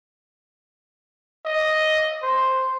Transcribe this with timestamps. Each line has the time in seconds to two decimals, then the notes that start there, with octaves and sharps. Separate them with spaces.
1.45 D#5
2.23 C5